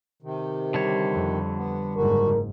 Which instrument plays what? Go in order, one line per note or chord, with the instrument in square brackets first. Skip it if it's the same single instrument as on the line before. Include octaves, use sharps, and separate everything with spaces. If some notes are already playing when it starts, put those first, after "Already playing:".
[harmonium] C3 D#3
[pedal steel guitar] D3 G3 C#5
[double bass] F2
[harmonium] B3
[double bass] F#1 G#2 [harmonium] F#4 [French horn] A#4